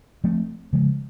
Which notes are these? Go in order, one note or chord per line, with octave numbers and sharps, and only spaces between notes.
F3 A3 C4
C#3 F3 G#3